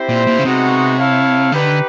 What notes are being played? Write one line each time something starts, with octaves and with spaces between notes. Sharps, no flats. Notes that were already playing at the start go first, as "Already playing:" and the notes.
Already playing: C4 E4 G4 C5
A#2
A#2
C#3
C3 G#3 B3 D#4 F#4
E4 A4 C#5 F5
D3 D#4 G4 B4